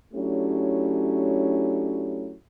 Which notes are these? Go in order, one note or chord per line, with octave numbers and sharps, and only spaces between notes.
F#3 A3 C#4 D4 E4 G4